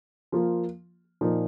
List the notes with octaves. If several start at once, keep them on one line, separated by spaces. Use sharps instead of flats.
F3 A#3 F4
A#2 F3 A#3 D#4